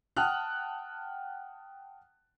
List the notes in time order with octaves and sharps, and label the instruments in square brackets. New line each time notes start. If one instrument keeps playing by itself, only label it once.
[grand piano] F#5 G5 A5 D#6 F6 F#6